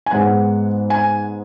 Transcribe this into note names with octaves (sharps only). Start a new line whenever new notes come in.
G#5
G#2 G#3 B3 F#5
G#5